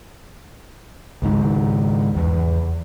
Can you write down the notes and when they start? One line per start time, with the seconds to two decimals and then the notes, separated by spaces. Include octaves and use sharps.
1.22 C#2 G#2 D#3
2.17 E2